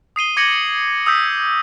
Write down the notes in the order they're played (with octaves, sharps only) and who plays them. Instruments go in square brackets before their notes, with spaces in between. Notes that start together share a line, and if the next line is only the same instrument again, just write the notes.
[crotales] D#6 C7 D#7 G7
D6 G#6 A#6 C#7 D#7 F#7
D#6 E6 G6 B6 C#7